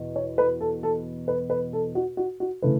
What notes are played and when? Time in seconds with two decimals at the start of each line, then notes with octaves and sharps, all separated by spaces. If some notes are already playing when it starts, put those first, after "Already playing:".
Already playing: E2 B2
0.16 C#5
0.38 B4
0.61 A4
0.83 A4
1.28 B4
1.50 B4
1.73 A4
1.95 F#4
2.17 F#4
2.40 F#4
2.62 C#3 E3 A3 B4